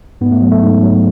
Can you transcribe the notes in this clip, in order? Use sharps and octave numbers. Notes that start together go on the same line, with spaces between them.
G#2 B3
A3
F#3
A3
G#2
F#3